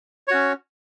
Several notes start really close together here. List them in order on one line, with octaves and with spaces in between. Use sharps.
C#5 F#4 C#4